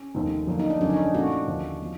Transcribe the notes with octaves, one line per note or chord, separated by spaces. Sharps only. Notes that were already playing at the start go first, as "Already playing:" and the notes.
Already playing: C#4
F1 D#2 D#3
F2 D3 F#3 A#3
D#4
D4
F#1 F2 D3 F#3 C#4
D#4
D4
A#2 F3 A3 C#4 F#4
D#2 D3 F3
F3